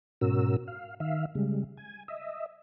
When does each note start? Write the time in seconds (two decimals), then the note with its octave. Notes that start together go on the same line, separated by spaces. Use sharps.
0.21 G#2 B2 C#4 F#4 A#4 E6
0.68 F5
1.00 D#3 E5 F5
1.35 C#3 G3 G#3
1.77 G#5
2.08 D#5 E5